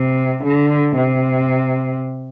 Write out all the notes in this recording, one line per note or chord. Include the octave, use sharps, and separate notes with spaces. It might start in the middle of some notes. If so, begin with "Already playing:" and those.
Already playing: C3
D3
C3